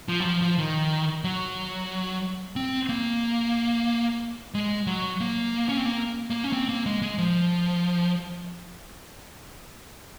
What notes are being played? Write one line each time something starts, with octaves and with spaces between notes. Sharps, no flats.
F3
F#3
F3
F3
D#3
F#3
C4
A#3
G#3
F#3
A#3
C#4
C4
A#3
A#3
C#4
C4
A#3
G#3
G#3
F3